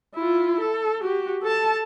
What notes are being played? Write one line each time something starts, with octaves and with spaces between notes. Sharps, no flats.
E4 F4
A4
F#4 G4
A4 A5